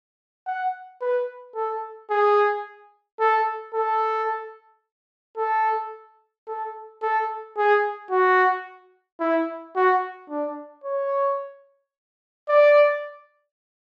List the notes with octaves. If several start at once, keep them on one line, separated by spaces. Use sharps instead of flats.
F#5
B4
A4
G#4
A4
A4
A4
A4
A4
G#4
F#4
E4
F#4
D4
C#5
D5